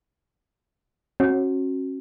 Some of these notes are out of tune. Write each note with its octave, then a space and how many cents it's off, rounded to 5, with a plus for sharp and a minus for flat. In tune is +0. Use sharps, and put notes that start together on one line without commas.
C#4 -35 F#4 +0